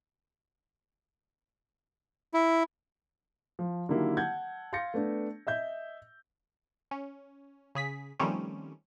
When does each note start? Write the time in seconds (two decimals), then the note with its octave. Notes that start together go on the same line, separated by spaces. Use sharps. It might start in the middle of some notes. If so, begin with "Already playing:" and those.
2.34 E4
3.59 F3
3.89 D3 D#3 F#3 A#3 E4 G4
4.17 F#5 A5 G6 G#6
4.73 F5 C6 G6 A6 A#6 C#7
4.94 A3 B3 D4
5.47 D#5 E5 G6
6.91 C#4
7.75 C#3 G#4 B6
8.20 D#3 F3 G3 A3 C4 C#4